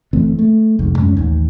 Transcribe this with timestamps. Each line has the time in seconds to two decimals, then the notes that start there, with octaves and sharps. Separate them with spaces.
0.13 G1 E3 A3 C4
0.39 A3
0.79 F1 C2 F2 G#2
0.98 F#2 G#3 A3 C#4
1.14 A1 D#2 D#3